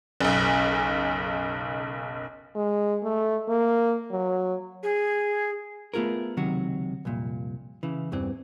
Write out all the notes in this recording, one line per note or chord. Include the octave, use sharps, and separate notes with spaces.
F#1 B1
G#3
A3
A#3
F#3
G#4
A3 B3 F4 G#4 A#4
C#2 C3 D#3 F#3 F#4
C2 F2 A#2
C#3 E3
E2 G2 E3 C4